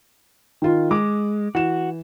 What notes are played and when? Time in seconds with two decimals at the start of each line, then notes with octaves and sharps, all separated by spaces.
0.62 D#3 F4
0.91 G#3 D6
1.55 E3 F#4 E7